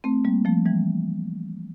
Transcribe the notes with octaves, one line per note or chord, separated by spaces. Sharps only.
A3 C4
G3 A#3
F3 A3
E3 G3